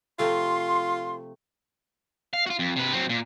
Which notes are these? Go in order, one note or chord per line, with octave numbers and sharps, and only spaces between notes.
C3 F3 A3 F4 C6
F5
F4 F#4
F2
C3 B4
F#3 C4
A#2